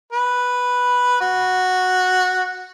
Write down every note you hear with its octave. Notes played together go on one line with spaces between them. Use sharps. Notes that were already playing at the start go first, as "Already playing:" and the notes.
B4
F#4